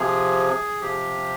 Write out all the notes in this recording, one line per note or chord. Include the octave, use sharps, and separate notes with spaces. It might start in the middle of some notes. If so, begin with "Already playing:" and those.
Already playing: C3 F3 G#4
C3 F3 G4